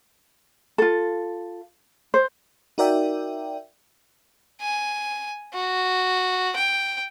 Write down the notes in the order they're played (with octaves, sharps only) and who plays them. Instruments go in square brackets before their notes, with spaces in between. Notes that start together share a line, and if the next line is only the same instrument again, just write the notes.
[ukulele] F4 A4
C5
[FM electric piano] D#4 F#4 A#4 D5 E5 G5
[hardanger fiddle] G#5
F#4
G5